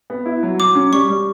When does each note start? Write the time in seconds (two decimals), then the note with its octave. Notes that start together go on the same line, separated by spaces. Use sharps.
0.10 B3
0.26 E4
0.43 F#3
0.59 F#3 D6
0.75 C#4
0.92 G3 C#6
1.09 G3